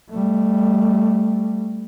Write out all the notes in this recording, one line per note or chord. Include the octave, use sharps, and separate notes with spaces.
G3 A3